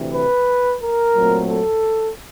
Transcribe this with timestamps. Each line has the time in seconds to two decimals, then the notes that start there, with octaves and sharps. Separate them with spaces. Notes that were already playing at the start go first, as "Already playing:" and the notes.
Already playing: D2 C3 E3
0.13 B4
0.80 A#4
1.15 A#2 F#3 A3 C4
1.48 A4